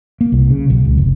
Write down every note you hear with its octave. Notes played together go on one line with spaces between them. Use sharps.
A#3
C2
C#3
B1
C#2
F1